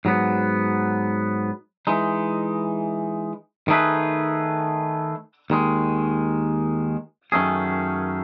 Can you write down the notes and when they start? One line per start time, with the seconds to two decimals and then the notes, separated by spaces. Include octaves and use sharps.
0.05 G#2 F#3 B3
1.87 E3 G#3 D#4
3.68 D#3 A3 D#4 G#4 B4
5.50 D#2 D#3 G#3
7.32 F#2 D#3 A3 C#4 G#4